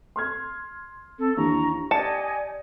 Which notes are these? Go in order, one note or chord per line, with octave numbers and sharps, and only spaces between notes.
C6 F6 G#6
C4 A4
D#2 E3 D4 A#5 C#6
G4 D5 D#5 G#5 A5 C#7